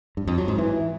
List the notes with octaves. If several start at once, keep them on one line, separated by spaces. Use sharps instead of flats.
G2
F2
F#3
G#2
E3